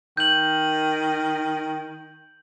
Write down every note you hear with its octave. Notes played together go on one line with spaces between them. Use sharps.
D#3 G6 F#7